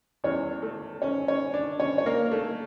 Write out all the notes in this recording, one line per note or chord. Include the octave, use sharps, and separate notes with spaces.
E2 E3 G3 C#4 C#5
A3 A4
C#4 C#5
C#4 C#5
D4 D5
C#4 C#5
C#5
A#3 A#4
A3 A4